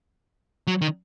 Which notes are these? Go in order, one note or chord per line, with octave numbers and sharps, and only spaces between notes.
F#3
D#3